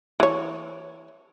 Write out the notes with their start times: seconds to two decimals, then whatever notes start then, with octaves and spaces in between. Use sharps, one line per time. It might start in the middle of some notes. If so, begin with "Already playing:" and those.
0.20 E3 C#5